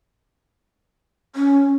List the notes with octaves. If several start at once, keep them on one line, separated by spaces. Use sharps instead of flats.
C#4